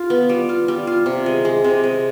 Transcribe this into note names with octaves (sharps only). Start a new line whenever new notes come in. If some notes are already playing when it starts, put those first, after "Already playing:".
Already playing: F4
B3
G3
F4
G3
F4
C3
G#3
G#3
C3
G#3